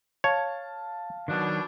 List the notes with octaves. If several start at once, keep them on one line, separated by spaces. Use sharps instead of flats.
C#5 F5 A5
B2 D#3 F#3 D4